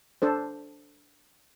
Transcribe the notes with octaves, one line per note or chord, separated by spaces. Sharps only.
D4 A4 C5